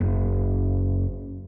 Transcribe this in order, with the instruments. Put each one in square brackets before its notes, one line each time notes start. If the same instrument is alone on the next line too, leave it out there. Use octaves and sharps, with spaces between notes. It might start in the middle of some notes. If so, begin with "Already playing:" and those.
[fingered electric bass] F#1